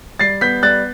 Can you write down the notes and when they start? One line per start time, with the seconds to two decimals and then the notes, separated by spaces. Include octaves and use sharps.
0.19 G3 A6 C7
0.41 B3 G6 B6
0.63 G3 F#6 A6